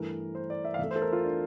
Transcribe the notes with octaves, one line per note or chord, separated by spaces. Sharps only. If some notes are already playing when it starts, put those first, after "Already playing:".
Already playing: G2 E3 A3 A#4
C5
D5
E5
F5
E2 E3 A3 E5
C5
A4
A#4
F4
D4